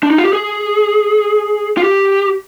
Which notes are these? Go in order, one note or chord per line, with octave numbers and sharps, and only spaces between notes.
D4
D#4
F4
G4
G#4
F4
G4